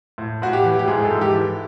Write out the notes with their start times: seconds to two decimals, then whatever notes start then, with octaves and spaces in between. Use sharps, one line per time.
0.18 A2
0.42 A2 F#4
0.53 G4
0.64 E3
0.79 G4
0.87 G#2 G#4
1.05 A4
1.10 G#2
1.21 G4
1.33 E3